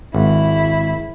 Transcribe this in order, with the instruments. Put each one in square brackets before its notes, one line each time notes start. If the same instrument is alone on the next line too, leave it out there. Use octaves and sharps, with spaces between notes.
[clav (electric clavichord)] G#1 [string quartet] E4